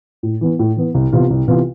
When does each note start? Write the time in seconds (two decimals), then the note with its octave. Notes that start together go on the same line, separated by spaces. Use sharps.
0.23 A2
0.41 E3 B3
0.59 A2
0.76 E3 B3
0.94 C2
1.12 C3 E3 B3 F4
1.30 C2
1.48 C3 E3 B3 F4